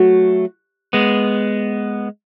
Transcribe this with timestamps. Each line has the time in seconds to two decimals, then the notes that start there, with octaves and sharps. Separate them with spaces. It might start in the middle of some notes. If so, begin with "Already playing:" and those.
Already playing: F#3 A3 F#4
0.93 G#3 B3